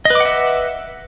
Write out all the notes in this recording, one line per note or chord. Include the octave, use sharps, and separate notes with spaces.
B4 D#5 E5 F#5 D6